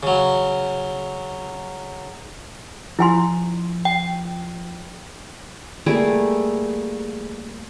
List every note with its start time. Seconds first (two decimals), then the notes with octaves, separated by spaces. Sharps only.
0.03 C#3 F#3
2.99 F3 E4 G#5 C6
3.85 G5
5.86 G3 A3 A#3 G#4